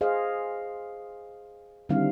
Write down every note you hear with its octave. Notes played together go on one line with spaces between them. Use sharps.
G#4 C5 D#5 F5
D3 D#3 G3 C4 E4 F5